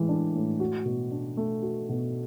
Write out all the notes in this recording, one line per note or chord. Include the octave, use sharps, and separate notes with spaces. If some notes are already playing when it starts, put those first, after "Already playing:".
Already playing: A2 E3 G#3
D4
A2
F#4
B2
D4
A3
F#4
B2